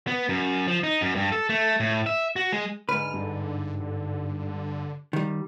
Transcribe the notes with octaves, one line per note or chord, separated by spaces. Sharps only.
B3
F#2
F3
D#4
F#2
G2
A4
A3
A2
E5
F#4
G#3
G#2 D3 B4 F6
G2
D3
D#3 G3